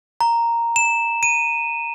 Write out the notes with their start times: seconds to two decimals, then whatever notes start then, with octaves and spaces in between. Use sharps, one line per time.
0.21 A#5
0.76 E7
1.23 D#7